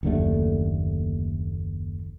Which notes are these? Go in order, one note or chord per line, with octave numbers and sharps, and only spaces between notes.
F#1 D#2 D3 A3